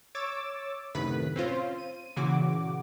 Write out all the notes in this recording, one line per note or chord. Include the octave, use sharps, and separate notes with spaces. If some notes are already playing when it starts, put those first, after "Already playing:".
C#5 D6 E6 A6
F#2 A2 C3 D#3 B4 B6
C4 C#4 F4 C5
D#7
A#2 C#3 E3 F#4 D6